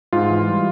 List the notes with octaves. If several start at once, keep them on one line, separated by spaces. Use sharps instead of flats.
G#2 F4
E3
G3